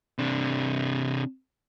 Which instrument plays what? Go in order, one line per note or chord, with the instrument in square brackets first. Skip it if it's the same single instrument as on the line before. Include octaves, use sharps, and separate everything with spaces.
[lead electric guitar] C3 D4